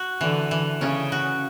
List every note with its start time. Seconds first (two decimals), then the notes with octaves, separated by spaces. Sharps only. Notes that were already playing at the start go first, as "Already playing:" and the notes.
Already playing: F#4
0.21 D3 E3
0.51 E3
0.81 C#3 C#4
1.12 F#4